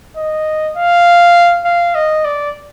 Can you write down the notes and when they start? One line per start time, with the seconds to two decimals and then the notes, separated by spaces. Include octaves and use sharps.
0.17 D#5
0.77 F5
1.65 F5
1.95 D#5
2.25 D5